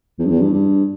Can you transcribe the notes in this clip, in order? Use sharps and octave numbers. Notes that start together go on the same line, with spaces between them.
E2
G2
E2
G2
G2